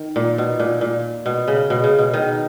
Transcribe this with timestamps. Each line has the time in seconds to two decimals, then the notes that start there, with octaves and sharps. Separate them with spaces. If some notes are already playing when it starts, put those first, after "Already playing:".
Already playing: D#3
0.16 A#2
0.38 B2
0.59 A#2
0.81 A#2
1.26 B2
1.48 C#3
1.70 B2
1.84 C#3
1.99 B2
2.14 D#3